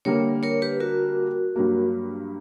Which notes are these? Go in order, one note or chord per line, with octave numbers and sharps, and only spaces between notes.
D3 G3 A#3 A#4 C#5
A#4 C#5
G4 B4
F#4 A#4
G2 F#3 A#3